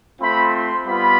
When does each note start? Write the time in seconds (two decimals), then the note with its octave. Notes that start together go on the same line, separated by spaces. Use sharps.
0.21 A3 C4 F4 B5
0.53 C6
0.86 G3 B3 F4 B5